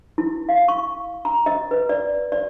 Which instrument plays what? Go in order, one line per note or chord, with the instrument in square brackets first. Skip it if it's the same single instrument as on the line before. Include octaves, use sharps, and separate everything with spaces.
[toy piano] E4
F5
C#6
A#5
D#5
B4
D5
D5